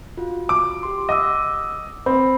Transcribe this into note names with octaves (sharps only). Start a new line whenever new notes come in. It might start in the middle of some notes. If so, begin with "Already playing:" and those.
F4 F#4
D6
G4 C6
D#5 F#5 D6 E6
C4 B5